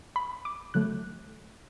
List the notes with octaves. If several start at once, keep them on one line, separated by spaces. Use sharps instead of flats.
B5
D6
D3 F#3 A3 F#6